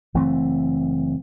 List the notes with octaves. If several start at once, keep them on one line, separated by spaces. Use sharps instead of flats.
F#1 E3 A3 C4